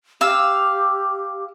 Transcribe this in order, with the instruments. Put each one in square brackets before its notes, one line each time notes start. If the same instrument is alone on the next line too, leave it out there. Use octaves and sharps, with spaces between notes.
[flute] G4 [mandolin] F5 E6